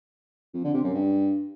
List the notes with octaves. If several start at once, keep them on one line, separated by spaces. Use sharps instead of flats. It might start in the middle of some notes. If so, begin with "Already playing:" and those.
F2
D3
C3
F#2
G2